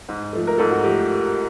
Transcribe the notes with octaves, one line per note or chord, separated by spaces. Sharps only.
G#2
F3 A3
A#4
G#2 A4
F#4
F3 A3 G4